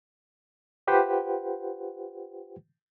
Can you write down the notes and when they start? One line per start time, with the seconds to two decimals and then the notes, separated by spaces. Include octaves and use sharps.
0.87 F4 G4 B4 C5 F#5 G5